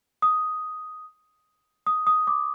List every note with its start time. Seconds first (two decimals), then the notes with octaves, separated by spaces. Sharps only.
0.22 D#6
1.87 D#6
2.07 D#6
2.27 D6